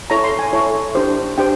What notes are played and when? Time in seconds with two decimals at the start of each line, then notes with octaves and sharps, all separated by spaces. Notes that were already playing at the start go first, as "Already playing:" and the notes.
0.10 E4 A4 C#5 A#5
0.24 C6
0.39 G#5
0.53 E4 A4 C#5
0.95 D4 G4 C5
1.38 D4 G4 C5 G5